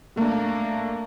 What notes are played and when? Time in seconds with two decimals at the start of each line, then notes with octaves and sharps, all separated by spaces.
0.17 A3 A#3 D4